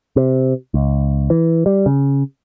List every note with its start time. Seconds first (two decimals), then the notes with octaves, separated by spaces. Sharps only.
0.16 C3
0.74 C#2
1.30 E3
1.66 G3
1.86 C#3